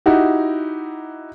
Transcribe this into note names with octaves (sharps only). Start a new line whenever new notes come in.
D#4 E4 F#4 G4